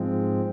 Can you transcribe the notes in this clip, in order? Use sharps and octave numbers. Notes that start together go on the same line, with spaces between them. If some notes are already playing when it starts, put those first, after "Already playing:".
Already playing: G#2 F3 G#3 C4